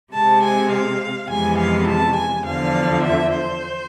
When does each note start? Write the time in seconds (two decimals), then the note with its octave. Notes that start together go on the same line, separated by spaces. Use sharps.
0.13 C3 G#3 C4 A5
0.42 G#5
0.71 F5
1.29 F2 C3 E3 G#3 B3 G#5
1.58 F5
1.88 A5
2.15 G#5
2.45 E2 D3 F3 F5
3.02 E5
3.31 C5